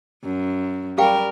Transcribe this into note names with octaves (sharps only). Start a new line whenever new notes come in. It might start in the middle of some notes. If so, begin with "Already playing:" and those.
F#2
G3 G4 A#4 F5 G5